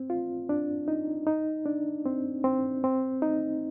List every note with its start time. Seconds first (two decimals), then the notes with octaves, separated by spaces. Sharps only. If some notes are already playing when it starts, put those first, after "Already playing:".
Already playing: C4
0.10 F4
0.49 D4
0.88 D#4
1.27 D#4
1.66 D4
2.05 C4
2.44 C4
2.84 C4
3.22 D#4